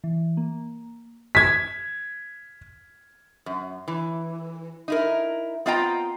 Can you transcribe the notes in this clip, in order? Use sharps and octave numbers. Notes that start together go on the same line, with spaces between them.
E3
A#3
G#6 B6
F#2
E3
D#4 E4 A#4
B3 C4 F4 D#5 G5 A#5